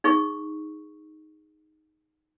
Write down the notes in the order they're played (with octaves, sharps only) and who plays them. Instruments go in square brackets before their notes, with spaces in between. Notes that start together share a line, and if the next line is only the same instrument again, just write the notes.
[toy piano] D#4 G#4 C#6